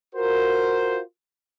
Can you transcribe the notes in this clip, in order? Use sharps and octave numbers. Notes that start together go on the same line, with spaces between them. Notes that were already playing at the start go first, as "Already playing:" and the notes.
F4 F#4 A#4 C5